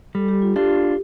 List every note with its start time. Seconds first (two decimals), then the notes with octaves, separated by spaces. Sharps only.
0.15 G3 A4
0.28 G4
0.42 F4
0.56 D4 F4 G4